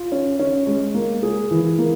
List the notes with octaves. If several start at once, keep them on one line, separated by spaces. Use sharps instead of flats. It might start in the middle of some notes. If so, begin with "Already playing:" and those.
Already playing: F4
C#4
C#4
G#3
A#3
G#4
E3
A#3